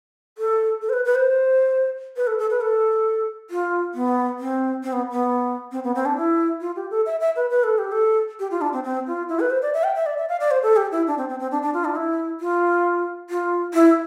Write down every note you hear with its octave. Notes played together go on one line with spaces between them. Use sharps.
A4
A4
C5
B4
B4
C5
B4
A4
A4
B4
A4
F4
B3
C4
C4
B3
B3
C4
B3
C4
D4
E4
F4
G4
A4
E5
E5
B4
B4
A4
G4
A4
G4
F4
D4
C4
C4
F4
E4
B4
C5
D5
E5
G5
E5
D5
E5
F5
D5
C5
A4
G4
E4
D4
C4
C4
C4
D4
D4
F4
D4
E4
F4
F4
E4